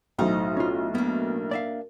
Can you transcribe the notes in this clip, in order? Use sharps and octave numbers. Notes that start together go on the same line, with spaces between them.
B1 A2 F#3 D#4 C5
C#4 F4
A#3 B3 D4
D5 E5 F5